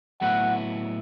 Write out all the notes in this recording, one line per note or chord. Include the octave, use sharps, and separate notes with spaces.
A2 F#3 B3 E4 F#5